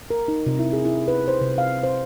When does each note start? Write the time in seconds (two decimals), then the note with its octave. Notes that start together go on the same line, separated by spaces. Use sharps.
0.10 A#4
0.28 D#4
0.46 C3
0.59 E4
0.73 G#4
0.86 E4
1.08 B4
1.28 C5
1.41 C3
1.58 F5
1.83 C5